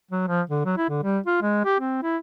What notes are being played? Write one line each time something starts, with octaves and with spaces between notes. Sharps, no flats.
F#3
F3
D3
F#3
E4
D3
G3
F4
G#3
G4
C4
E4